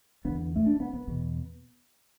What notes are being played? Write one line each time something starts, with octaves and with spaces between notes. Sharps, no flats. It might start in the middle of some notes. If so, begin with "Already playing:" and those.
E2 D3 B3
A3
D4
B3
B3
E2 B2